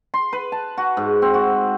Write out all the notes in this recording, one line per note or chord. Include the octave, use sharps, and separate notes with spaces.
C6
B4
A5
F#4
G#2
C4
F#4